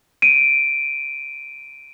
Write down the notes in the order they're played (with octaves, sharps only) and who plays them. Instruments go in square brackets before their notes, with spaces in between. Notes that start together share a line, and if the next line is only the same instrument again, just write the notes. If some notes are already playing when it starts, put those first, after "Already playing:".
[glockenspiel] D7 D#7